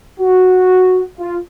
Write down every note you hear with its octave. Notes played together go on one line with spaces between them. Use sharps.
F#4
F4